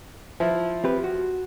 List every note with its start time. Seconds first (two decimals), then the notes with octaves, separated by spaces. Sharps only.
0.40 F3 E4
0.84 C4 G4 B4
1.04 F#4